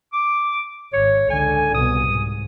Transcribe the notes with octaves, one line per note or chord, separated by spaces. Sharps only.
D6
G#1 C#5
C#2 D3 G#5
C2 B2 D#6
G#2